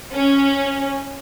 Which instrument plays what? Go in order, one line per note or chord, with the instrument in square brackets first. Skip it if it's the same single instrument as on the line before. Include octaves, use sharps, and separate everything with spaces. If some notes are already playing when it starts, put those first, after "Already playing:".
[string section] C#4